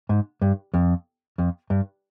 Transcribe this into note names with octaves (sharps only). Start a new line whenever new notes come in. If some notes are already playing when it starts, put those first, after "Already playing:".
G#2
G2
F2
F2
G2